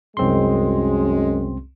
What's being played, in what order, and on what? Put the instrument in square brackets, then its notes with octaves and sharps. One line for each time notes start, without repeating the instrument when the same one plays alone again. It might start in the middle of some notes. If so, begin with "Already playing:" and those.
[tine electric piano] C2 C4 C6 [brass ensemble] F#2 G#3